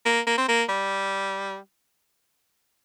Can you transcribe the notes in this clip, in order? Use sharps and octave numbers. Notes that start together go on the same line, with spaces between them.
A#3
A#3
C4
A#3
G3